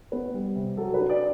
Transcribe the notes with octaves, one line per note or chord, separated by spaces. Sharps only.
B3 B4
G3
C3
F#3 A4
B4
D4
D5